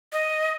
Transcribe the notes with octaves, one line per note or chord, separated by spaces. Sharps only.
D#5